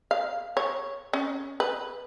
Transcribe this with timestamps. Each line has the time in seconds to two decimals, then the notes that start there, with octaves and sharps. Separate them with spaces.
0.11 F5
0.57 C#5
1.13 C#4
1.60 B4